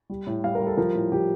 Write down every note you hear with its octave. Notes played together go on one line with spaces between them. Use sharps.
G3
A2
G3 F5
A#4
G3
A4
F3 A#4
A2
F3 G4